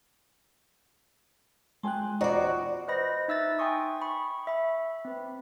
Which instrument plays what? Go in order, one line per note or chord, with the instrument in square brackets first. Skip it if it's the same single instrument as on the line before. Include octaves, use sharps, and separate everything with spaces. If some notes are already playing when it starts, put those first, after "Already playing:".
[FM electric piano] G#3 F#6 [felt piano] G5 G#5 C6
[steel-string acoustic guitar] E2 D5 [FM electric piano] F4 [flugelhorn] F#4 [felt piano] C5 D#5 A#5
[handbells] B4 C5 D#5 B5 A#6
D#4 E5 E6 F#6 A6
G5 G#5 C6 C#6 D#6
B5 C#6
E5 B5
C4 B4